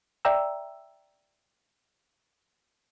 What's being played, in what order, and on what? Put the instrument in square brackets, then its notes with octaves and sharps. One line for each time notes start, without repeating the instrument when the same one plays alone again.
[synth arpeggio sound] D5 E5 G5 A#5 E6